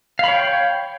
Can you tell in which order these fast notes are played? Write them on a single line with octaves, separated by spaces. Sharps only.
F5 B5 C#5 G5